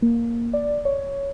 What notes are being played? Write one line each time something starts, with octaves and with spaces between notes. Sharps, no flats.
A#3
D5
C#5